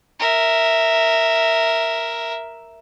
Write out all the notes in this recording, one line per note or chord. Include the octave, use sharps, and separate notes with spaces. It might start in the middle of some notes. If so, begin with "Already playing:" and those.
A#4 E5